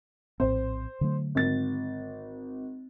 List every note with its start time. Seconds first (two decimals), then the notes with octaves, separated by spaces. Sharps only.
0.40 A#1 A2 C4 C5
1.01 D3 F#3 A3
1.35 G#1 A6